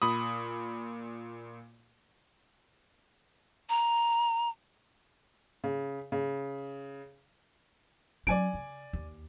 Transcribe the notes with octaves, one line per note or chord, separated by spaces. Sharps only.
A#2 B5 D#6
A#5
C#3
C#3
F#3 C#4 D5 G#5 D7
C#3
D#2